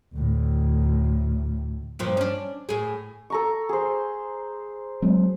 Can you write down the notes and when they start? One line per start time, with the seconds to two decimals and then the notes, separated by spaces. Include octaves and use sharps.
0.15 D2 A2
1.99 G2 A#2 F3
2.17 C#4 D4
2.69 A2 G#4
3.30 A4 A#5 C#6
3.69 G#4 C5
5.02 F#3 G#3 C4